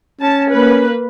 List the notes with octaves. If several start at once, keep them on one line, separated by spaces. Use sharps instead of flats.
C#4 A5
A#3 B4